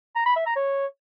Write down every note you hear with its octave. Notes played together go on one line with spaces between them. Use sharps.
A#5
B5
E5
A#5
C#5